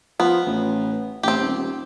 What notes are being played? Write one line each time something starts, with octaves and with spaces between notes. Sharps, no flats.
F3 B3
A1
A1 C4 G4
D#1